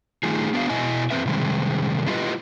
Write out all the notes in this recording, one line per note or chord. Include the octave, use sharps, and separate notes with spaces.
D#3 G3 A3 D#4 F4 G#4
B3 D4 F#4 F5
B2 E4 D#5 G#5
E2 G#3 C4 B4 E5
C3 D#3 G3 G#3
D4 E4 F4 G4 B4 D#5